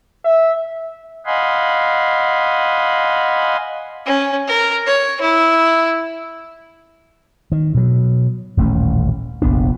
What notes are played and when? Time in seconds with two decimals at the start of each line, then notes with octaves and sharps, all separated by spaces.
0.25 E5
1.26 D#5 F5 F#5 G#5 B5 C6
4.06 C#4
4.48 A#4
4.87 C#5
5.21 E4
7.52 D#3
7.74 B2 F#3
8.57 D#1 A1 A3 C#4
9.42 F1 A#1 B3 D4